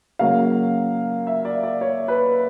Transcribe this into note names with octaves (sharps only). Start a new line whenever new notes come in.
C#3 F#3 A#3 F5
E5
D5
D5
C#5
B4